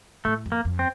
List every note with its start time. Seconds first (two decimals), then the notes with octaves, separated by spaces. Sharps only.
0.25 A2 A3
0.46 F2
0.52 A#3
0.65 F2
0.79 C4